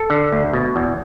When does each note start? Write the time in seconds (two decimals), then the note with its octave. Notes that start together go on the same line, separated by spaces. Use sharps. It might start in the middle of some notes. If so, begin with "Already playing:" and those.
Already playing: A4
0.10 D3
0.32 D2
0.53 B2
0.76 E2